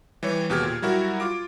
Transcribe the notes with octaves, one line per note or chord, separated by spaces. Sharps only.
E3 G3 G4 C#5
D#2 B2 G4 G#4 F6 G#6
A#2
F#3 G3 E4 F#4 A#4
F4 D6 D7